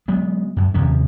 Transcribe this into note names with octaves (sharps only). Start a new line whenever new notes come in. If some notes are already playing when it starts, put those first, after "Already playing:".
F#3 G#3 B3
F#2
D#2 C3 F3 C#4